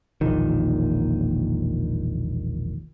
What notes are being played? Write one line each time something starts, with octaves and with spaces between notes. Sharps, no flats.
E1 A#1 A#2 D#3